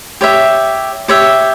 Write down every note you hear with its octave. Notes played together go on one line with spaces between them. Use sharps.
G4 C#5 E5
G4 C#5 E5